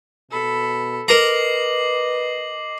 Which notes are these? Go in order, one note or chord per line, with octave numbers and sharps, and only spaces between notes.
B2 A4 B5
A#4 B4 D#5 A#5 D6 C7 F#7